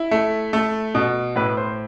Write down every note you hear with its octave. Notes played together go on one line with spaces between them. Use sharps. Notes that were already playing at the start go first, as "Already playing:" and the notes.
Already playing: E4
A3
A3
B2
A2 B4
C5